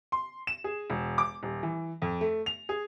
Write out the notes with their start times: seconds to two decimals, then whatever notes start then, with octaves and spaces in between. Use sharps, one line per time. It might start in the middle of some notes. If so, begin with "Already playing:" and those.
0.12 C6
0.47 E7
0.64 G#4
0.90 E1
1.18 D6
1.43 D#1
1.63 E3
2.02 F2
2.21 A3
2.46 F7
2.69 G#4